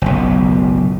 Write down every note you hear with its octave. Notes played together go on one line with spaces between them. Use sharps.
F#1 B1